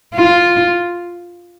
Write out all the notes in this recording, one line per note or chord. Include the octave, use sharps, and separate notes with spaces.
F4